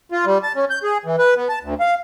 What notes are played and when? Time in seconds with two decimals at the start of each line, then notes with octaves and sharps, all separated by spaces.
0.12 F4
0.25 G3
0.43 A5
0.55 C#4
0.70 G6
0.83 G#4
1.05 E3
1.19 B4
1.37 B3
1.49 A5
1.63 D2
1.80 F5